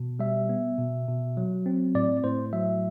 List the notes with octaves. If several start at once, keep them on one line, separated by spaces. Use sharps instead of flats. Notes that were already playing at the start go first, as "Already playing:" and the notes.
Already playing: B2
G3 E5
B3
B2
B2
F#3
C4
A2 D5
A2 C5
F#3 E5